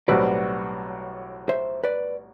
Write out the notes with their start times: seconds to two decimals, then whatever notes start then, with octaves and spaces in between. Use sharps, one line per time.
0.08 B1 A2 G3 C4 F#4 B4 D5
1.49 C5 E5
1.84 B4 D5